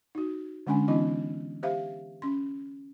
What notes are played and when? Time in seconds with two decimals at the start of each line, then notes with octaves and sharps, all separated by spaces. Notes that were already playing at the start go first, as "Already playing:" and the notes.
0.15 D#4 F#4
0.67 D3 G#3 C#4 D4 G#5
0.88 E3 B3 C#4 D#4 F4 D#5
1.63 G4 C5 E5 F5
2.22 C#4 C6